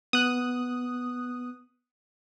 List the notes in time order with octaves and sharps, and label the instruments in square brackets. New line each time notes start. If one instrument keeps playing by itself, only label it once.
[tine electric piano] B3 [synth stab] D#6 F#6